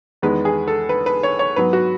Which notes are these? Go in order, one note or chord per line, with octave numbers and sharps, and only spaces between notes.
E2 D#3 G#3 B3 B4
G#4
A4
B4
B4
C#5
C#5
G#2 F#3 B3 B4
F#4